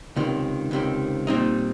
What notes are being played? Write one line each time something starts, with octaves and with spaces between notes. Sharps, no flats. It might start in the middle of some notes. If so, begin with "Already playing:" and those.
C#2 C3 D#3
C#2 C3 D#3
A#2 G3 C4 D#4